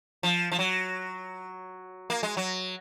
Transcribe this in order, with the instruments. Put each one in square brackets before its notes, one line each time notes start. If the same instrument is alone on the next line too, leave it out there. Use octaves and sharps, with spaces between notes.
[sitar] F3
F3
F#3
A#3
G#3
F#3